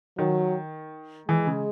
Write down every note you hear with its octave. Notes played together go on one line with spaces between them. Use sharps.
D#3 F#3
E3 G#3
C#3